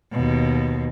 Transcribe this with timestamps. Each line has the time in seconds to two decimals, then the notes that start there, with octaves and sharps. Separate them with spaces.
0.12 D#2 B2